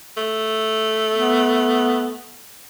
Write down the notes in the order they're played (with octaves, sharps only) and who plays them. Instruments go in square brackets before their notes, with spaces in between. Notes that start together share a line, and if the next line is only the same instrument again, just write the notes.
[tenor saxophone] A3
[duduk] B3